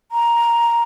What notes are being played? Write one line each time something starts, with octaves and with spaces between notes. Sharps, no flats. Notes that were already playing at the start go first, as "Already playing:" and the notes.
A#5